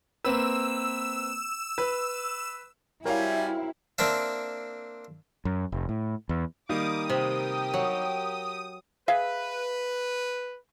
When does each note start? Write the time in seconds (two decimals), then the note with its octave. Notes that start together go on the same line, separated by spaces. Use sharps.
0.24 A#3 C4 B4 E6
1.78 B4
3.05 F#3 G3 C4 E4 A#4 C#5 F5 G#5
3.98 A#3 C4 D4 E5
5.45 F#2
5.72 F1
5.89 A2
6.29 E2
6.69 D#3 G3 A#3 D6 D#6
7.10 C3 G4 A#4 G5
7.74 F#3
9.08 G#4 B4 E5 F5